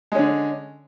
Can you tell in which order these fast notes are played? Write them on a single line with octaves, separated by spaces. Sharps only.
G#3 C#4 D3